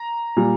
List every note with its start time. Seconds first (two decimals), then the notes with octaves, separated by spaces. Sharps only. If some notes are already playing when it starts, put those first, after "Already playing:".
Already playing: A#5
0.37 A#2 G3